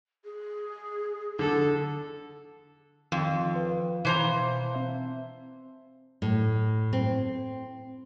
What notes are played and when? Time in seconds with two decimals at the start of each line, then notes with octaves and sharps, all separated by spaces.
0.24 G#4
1.39 D3 A4
3.12 F2 D#3
3.55 B4 F5
4.05 B2 E3 C5 F5 A5 A#5
4.74 C4 E5
6.22 A2
6.93 C4